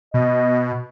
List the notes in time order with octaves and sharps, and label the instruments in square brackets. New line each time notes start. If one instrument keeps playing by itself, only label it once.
[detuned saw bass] B2 [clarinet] D#5